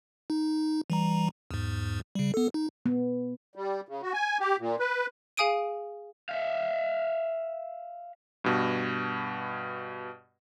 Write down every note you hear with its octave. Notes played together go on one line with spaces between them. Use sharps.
D#4
E3 G3 A#5
E2 G#2
C#3 G3
B3 A4
D#4
B3
G3
C#3
F#4
G#5
G4
A#2
B4
G#4 F5 G#5 D#6 D7 D#7
E5 F5
G2 B2